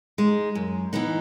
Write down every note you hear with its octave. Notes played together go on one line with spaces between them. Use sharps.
G#3 D#4
F#2
E3 B3 D#4